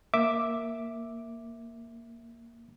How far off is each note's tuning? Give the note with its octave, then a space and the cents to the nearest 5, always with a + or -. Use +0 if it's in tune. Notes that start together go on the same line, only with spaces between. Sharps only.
A#3 +0 E5 +0 D6 +0